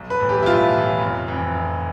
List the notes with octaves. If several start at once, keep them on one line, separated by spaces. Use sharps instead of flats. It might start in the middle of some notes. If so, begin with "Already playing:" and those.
Already playing: B1
B4
A2 E3
G4
E4
B1 F4
A2 E3
F1
F2 E3
F1